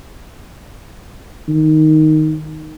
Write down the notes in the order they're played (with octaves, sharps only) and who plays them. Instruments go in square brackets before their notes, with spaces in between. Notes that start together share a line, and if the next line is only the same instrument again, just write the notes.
[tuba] D#3